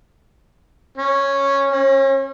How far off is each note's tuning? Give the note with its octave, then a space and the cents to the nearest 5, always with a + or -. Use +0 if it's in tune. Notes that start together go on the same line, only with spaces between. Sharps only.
C#4 -5
C#4 -35